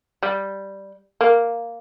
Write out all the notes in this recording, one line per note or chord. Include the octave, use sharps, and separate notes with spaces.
G3
A#3